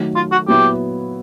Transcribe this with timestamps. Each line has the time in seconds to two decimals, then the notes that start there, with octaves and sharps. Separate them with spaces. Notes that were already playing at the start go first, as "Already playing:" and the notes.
Already playing: D#3 F#3 A3
0.16 F4
0.32 F#4
0.48 A#2 F#3 B3 E4 G4